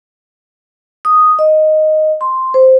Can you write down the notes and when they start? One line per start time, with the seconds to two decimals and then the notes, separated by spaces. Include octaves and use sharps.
1.05 D#6
1.39 D#5
2.21 C6
2.54 C5